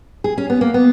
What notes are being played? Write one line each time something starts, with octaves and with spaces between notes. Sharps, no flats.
G#4
C#4
B3
A#3
B3